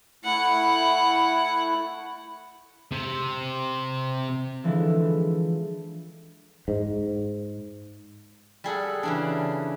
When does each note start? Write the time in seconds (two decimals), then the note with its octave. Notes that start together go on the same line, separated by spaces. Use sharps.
0.25 A3 E4 F#5
2.91 C3
4.64 D3 E3 F3 G#3 D4 E4
6.68 G#2
8.64 G3 G#4 A4 F#5
9.03 C#3 E3 D4